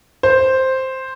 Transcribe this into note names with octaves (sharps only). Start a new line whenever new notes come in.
C5